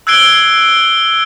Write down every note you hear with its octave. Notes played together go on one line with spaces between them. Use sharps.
E6 F#6 G#6 C7 D7 G7